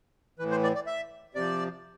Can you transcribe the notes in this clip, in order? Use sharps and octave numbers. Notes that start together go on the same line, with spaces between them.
A2 E3 B4
C5
D5
D5
E5
C3 F3 D5